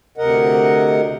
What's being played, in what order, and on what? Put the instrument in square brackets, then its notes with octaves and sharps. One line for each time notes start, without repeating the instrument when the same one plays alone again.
[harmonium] D2 C3 A#4 D#5 F#5